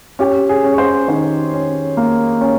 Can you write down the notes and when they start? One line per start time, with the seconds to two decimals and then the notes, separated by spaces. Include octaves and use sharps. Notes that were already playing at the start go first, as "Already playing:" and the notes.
0.19 C#4 G4
0.49 G#4
0.64 C#4
0.74 C#5
0.78 C5
1.08 D#3 C5
1.53 C#4
1.97 A#3
2.41 C#4